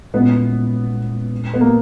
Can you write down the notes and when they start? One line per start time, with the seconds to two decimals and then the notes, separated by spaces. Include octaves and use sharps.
0.14 A#2 G#3 B3 C#4 E4
1.53 B3
1.61 A#3